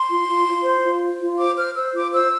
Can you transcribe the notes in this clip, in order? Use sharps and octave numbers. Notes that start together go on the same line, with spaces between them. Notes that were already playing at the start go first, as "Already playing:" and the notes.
Already playing: C6
F4
F4
F4
C5
F4
C5
F4
C5 D6
C5 F6
C5 E6
F4 D6
C5 E6